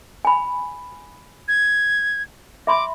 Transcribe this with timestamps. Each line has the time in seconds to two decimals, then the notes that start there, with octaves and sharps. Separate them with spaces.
0.25 G#5 B5
1.48 G#6
2.67 E5 B5 C6 D6